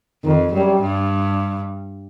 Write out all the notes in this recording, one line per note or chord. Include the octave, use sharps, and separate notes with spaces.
F2 D#3
F#2 G3
G2